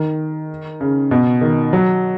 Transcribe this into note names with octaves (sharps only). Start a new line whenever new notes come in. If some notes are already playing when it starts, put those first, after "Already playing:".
Already playing: D#3
C#3
B2
D#3
F#3